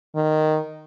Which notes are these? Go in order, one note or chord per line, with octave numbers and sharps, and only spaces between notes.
D#3